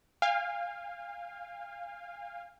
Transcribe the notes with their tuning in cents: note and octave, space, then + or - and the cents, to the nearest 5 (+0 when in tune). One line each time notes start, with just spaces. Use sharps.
F5 +0 G#5 -40